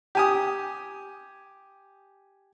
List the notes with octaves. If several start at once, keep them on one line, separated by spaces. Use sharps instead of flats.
G4 G#5 D#6